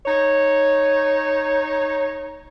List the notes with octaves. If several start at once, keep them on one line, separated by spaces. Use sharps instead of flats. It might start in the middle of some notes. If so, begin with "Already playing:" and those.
D#4 C#5